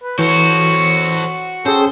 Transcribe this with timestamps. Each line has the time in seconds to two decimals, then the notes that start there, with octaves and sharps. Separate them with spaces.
0.03 B4
0.19 E3 F#4 A4 C5 C#5
1.66 C#4 G#4 A4 C5 G5